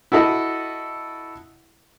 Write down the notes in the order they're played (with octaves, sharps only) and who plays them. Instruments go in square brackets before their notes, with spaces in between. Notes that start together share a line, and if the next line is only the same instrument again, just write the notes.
[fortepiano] E4 F#4 A4 D#5